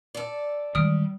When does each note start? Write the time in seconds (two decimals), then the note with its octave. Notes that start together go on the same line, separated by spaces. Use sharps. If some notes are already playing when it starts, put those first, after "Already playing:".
0.15 A4 D5
0.75 D#3 E3 G3 G#3 D#6 F6 D7